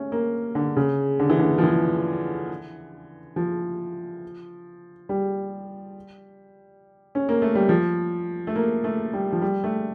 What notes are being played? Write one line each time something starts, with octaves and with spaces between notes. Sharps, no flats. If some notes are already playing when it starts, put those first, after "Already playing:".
Already playing: A3 C#4
A#3
D3
C#3
D3
E3
D3
F3
E3
F3
G3
C#4
A#3
A3
G3
F3
A3
A#3
A3
G3
F3
G3
A3